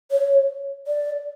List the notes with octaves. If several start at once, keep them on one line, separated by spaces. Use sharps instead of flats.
C#5
D5